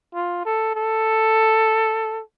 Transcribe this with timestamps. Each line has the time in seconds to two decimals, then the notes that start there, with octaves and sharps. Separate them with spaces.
0.15 F4
0.45 A4
0.75 A4